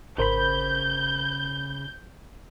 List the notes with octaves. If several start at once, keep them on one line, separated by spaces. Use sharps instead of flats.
G#1 C#3 A#4 C5 B5 G6